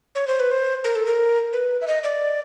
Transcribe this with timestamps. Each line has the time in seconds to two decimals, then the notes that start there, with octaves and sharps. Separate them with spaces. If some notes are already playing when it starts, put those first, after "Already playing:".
0.15 C#5
0.27 C5
0.40 B4
0.51 C5
0.84 A#4
0.95 A4
1.06 A#4
1.53 B4
1.81 E5
1.87 D#5
2.03 D5